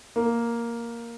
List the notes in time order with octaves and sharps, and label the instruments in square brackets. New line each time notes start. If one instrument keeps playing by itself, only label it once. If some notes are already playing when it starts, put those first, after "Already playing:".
[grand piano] A#3